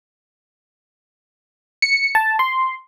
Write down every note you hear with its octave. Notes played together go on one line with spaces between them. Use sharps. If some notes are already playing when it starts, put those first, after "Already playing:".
C#7
A5
C6